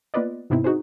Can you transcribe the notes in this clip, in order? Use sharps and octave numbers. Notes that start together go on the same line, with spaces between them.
A#3 B3 F4 B4 D5 D#5
G#2 C3 B3 C4 D#4 E4
D#4 F#4 G#4 C5